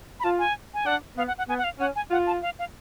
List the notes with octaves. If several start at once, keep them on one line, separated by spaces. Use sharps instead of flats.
B5
F4 A5
G#5
G#5
D4 F#5
B3 F5
F#5
F#5
B3 G#5
F#5
F5
C#4 F#5
G#5
F4 F#5
A5
F5
F5